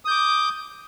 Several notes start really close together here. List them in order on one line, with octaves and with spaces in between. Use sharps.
D#6 G6 D6